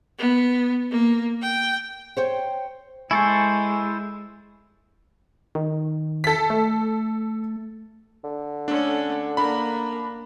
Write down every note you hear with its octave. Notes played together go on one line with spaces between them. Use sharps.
B3
A#3
G5
C5 C#5 G5
G#3 E4 A4 C5 G#5 C#6
D#3
A4 B6
A3
D3
A3 C#4 D4
A#3 D4 A#4 B5